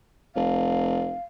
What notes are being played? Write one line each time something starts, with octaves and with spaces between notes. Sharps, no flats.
F1 F5